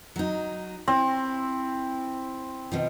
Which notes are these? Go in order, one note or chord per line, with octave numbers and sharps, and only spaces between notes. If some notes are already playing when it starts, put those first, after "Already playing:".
F#3 D#4
C4 E4
B2 D#3 F3